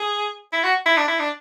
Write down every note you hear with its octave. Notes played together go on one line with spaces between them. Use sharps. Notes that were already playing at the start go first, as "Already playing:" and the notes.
Already playing: G#4
E4
F#4
E4
D4
E4
D4